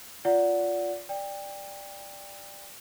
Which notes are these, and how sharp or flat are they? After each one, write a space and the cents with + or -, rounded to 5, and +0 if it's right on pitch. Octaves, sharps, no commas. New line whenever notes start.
F4 +0 D5 -25 F#5 -5
D5 +0 G5 +25